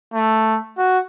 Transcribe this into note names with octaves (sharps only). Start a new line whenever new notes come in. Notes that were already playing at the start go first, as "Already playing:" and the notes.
A3
F#4